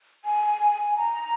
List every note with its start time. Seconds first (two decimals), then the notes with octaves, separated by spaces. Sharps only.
0.25 G#5
0.97 A#5